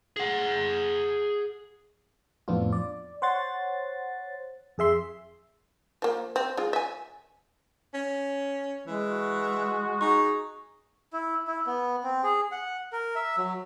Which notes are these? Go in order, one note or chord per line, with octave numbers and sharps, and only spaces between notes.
G#4 F#5
F2 A2 F3 B3 D4 F4
D5
C5 C#5 F#5 C6 A6
F2 G#4 E5 C6
F3 A#3
C4
G#3 F4
E5 G#5
C#4
E3 G#3
F#4
D#4 G#4 C#6
E4
E4
B3
C4
G#4
F#5
A#4
E5
F#3